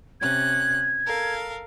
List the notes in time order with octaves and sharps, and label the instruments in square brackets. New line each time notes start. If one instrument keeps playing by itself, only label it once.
[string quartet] C3 C#4 F#6 [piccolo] G#6
[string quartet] A4 A#4 F5